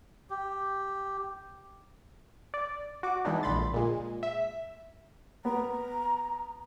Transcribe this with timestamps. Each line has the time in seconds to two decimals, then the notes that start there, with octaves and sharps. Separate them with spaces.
0.30 G4
2.54 D5
3.03 F#4 D6
3.25 E3 G#3 B3 D4 D#4
3.43 A#1 D3 B5 C6 A6
3.74 A#2 G#3
4.23 E5
5.45 B3 A#5